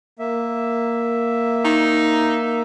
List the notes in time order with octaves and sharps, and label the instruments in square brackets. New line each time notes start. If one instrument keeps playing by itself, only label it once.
[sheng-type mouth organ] A#3 E5
[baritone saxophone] D#4